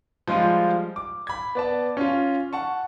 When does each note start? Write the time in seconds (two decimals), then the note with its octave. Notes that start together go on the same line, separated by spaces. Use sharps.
0.28 F3 G3 G#3 F4
0.96 D6
1.27 B5 G#6
1.55 B3 D5 A5
1.97 C#4 F4
2.53 F#5 A5 C#6